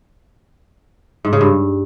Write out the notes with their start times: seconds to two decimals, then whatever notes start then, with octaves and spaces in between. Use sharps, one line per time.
1.25 G#2
1.33 C#3
1.41 G2